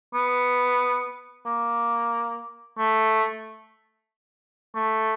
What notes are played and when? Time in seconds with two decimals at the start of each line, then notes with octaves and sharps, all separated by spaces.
0.14 B3
1.46 A#3
2.78 A3
4.75 A3